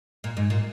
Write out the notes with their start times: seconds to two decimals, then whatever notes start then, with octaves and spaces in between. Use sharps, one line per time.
0.24 A#2
0.37 G#2
0.50 A#2